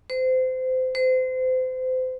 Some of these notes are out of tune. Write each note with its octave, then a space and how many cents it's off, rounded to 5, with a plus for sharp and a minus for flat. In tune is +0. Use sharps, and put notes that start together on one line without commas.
C5 -25
C5 -30